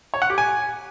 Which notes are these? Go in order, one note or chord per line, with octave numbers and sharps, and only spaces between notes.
C#5
F#5
G4
G#5